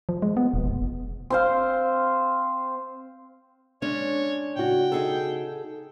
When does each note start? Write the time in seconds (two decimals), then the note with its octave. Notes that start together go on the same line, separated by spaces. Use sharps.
0.09 F3
0.22 G#3
0.37 B3
0.54 E1
0.66 F1
1.30 C4 C5 F5
3.82 G#3 C#4 D4 C#5
4.56 C#3 F#4 G5
4.92 D#4 G#4 A4